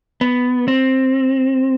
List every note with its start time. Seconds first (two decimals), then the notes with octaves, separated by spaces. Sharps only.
0.21 B3
0.68 C4